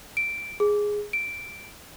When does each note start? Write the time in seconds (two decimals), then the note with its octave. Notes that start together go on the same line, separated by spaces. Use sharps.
0.17 D7
0.60 G#4
1.13 D7